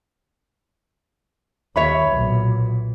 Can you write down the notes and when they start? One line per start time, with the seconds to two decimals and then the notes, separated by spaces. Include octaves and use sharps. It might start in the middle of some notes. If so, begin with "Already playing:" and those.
1.76 D#2 C#5 E5 B5
2.10 B1 A#2